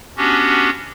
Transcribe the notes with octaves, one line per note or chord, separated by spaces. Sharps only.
B3 C#4 D4 F#4 G4